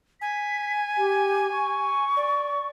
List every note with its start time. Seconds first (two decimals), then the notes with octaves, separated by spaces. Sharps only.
0.21 G#5 B6
0.97 G4
1.52 C#6
2.17 D5